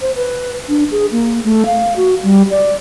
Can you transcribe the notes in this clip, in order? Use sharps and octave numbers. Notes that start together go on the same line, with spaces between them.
C5
B4
D4
G#4
A#3
A3
F5
F#4
G3
D5